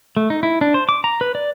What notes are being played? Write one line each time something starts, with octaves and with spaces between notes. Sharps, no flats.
A3
D#4
E4
D4
C5
D6
A#5
B4
D5